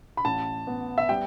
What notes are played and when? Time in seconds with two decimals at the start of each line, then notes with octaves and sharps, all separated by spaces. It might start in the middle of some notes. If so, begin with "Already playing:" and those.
0.17 B5
0.25 A1 A5
0.67 B3
0.98 E5
1.09 G3 G5